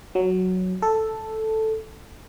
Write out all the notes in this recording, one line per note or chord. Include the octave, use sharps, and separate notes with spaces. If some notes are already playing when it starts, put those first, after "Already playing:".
F#3
A4